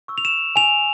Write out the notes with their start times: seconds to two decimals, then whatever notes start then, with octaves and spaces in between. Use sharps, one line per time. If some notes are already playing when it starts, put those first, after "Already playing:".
0.08 C#6 E6
0.18 F7
0.25 E7
0.56 G#5 F7